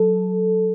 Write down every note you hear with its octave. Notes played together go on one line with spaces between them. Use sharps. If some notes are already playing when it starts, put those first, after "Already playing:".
Already playing: F#3 A4